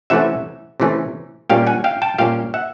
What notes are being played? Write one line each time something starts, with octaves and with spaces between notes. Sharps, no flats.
C3 E3 A3 C#4 E5 F#5
C3 E3 A3 C#4
A#2 G3 A#3 C#4 F5 G5
F#5 G#5
F5 G5
G5 A5
A#2 G3 A#3 C#4 F5 G5
E5 F#5